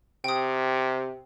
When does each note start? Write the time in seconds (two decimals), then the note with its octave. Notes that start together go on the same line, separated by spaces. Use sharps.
0.24 C3 G5 D#6